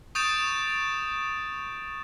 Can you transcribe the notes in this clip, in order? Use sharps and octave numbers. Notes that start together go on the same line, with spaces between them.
C#6 D#6 G6 A6 D7 E7